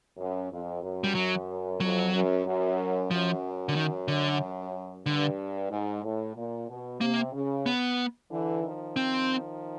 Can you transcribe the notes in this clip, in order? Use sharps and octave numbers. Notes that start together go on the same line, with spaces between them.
F#2
F2
F#2
G3
F#3
F2 F#3
F#2
F#2
F#2 F3
D3
D#3
D3
G2 D3
G#2
A2
A#2
B2
C3 A#3
C#3
B3
D3 E3
D#3 F3
C4